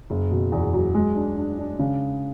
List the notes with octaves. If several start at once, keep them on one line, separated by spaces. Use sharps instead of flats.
F#1
B2
E2
F#3
G#3
D4
D4
D4
C#3